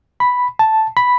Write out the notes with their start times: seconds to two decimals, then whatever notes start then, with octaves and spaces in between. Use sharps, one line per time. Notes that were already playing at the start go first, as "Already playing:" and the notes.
0.20 B5
0.59 A5
0.97 B5